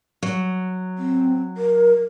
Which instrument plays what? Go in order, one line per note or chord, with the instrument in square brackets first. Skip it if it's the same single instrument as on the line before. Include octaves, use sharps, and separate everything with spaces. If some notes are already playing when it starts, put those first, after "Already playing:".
[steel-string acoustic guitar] F#3
[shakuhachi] C4
A#4